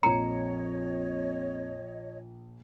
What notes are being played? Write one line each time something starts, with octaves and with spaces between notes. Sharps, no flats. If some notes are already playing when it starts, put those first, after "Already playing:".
A#1 F2 C#5 D#5 A#5 C#7